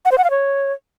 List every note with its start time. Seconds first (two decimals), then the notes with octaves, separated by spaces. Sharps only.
0.05 F#5
0.12 C5
0.18 F#5
0.24 F5
0.31 C#5